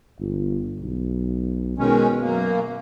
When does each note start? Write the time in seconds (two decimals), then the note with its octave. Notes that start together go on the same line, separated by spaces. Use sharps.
0.20 G1
0.81 B1
1.78 B2 D#3 G#3 C#4
2.21 F#2 A#3